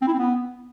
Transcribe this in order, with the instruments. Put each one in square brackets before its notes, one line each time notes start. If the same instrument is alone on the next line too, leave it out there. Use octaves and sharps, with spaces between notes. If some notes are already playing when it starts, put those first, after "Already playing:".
[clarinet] C4
E4
C4
B3